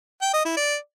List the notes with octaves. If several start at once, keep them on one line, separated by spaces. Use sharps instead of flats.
G5
D#5
E4
D5